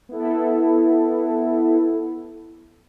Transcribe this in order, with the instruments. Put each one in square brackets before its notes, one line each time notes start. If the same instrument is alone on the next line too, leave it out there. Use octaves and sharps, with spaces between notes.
[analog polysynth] B3 E4 A4